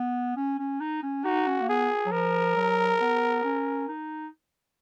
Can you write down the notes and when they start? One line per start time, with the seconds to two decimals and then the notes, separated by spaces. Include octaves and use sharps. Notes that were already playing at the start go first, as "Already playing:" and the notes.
Already playing: B3
0.37 C#4
0.59 C#4
0.80 D#4
1.03 C#4
1.24 D#4 F#4
1.47 C#4
1.61 A#3
1.69 B3 G#4
2.06 F#3
2.12 F3 A#4
2.56 F#3
3.01 B3
3.44 C#4
3.88 D#4